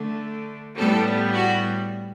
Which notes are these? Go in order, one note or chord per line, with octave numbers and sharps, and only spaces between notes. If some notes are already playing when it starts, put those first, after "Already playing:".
Already playing: D3 A3
A2 G3 B3 A4
F#4